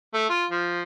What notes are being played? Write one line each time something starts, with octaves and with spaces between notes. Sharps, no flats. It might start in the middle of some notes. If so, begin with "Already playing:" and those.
A3
F4
F3